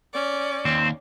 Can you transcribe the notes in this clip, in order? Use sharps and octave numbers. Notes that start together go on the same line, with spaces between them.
C#4 D5
D#2 C4